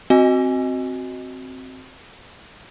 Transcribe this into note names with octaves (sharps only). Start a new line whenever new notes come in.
C4 F#4 D#5 G#5